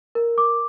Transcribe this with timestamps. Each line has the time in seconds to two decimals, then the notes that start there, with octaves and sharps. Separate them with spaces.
0.15 A#4
0.38 D6